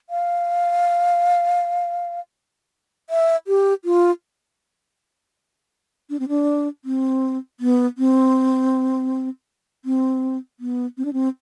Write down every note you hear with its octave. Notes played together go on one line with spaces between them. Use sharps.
F5
E5
G4
F4
D4
C4
D4
C4
B3
C4
C4
B3
C4
D4
C4